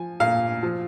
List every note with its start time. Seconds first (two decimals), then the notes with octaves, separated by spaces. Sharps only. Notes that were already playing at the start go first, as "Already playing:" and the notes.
Already playing: F3 G#5
0.20 A#2 F5
0.63 F3